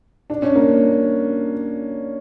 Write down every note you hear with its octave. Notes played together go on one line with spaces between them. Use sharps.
D4
C#4
A#3